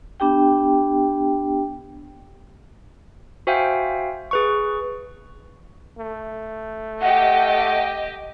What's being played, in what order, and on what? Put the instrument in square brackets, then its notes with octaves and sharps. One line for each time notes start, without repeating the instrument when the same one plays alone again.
[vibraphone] B3 D4 G4 G5
[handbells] F#4 C5 E5 F5 G5 G#5
G#4 B4 C#6
[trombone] A3
[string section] G4 D#5 [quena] F#5